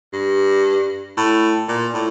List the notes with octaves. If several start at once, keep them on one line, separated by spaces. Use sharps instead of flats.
G2
A2
A#2
A2